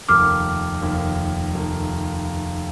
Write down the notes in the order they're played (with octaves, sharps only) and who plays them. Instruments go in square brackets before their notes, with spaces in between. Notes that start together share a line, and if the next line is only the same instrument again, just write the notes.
[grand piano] F1 D#2 D#3 [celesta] D6 F6
[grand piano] F1 D#2 D#3
F1 D#3